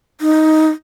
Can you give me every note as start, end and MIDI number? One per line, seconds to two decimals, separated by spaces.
0.21 0.70 63